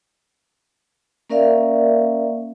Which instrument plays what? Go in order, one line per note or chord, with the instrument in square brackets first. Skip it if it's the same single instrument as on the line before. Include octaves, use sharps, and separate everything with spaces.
[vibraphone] A#3 C#4 A#4 D5 E5 F5